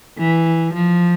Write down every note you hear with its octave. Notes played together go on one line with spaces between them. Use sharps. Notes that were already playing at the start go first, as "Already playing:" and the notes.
E3
F3